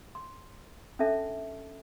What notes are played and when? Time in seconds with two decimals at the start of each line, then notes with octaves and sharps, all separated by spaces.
0.15 C6
0.99 C#4 D4 A4 E5 A5